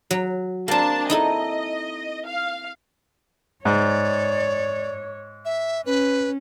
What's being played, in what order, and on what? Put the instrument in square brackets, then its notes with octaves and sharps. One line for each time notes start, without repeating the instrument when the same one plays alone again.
[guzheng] F#3
[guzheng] A#3 C4 [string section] D4 A5
[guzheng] D#4 E4 A4 [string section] D#5
[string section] F5
[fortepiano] G#2 [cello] C#5 [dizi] D5
[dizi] E5
[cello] C#4 [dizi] B4